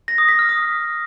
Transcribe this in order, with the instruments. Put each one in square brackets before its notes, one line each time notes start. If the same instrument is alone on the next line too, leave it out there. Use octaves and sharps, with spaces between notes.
[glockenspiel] A#6
D#6
B6
F6
D#6